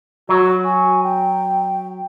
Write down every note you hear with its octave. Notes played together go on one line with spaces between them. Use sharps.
F#3 F#4
G#5
G5